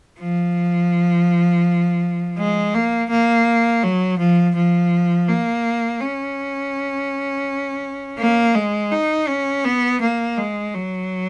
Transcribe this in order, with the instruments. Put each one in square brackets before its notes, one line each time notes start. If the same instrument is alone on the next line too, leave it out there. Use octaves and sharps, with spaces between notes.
[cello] F3
G#3
A#3
A#3
F#3
F3
F3
A#3
C#4
A#3
G#3
D#4
C#4
B3
A#3
G#3
F#3